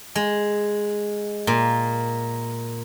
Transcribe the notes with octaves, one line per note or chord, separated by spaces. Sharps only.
G#3
A#2